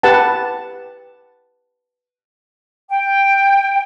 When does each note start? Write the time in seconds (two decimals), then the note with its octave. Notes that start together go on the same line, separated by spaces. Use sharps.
0.03 G4 B4 F#5 A5
2.89 G5